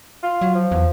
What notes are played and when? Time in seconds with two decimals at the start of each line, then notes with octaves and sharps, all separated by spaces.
0.23 F4
0.41 F#3
0.55 F3
0.71 E2